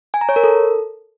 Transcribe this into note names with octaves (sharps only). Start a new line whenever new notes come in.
G#5
A#5
C#5
A#4
A4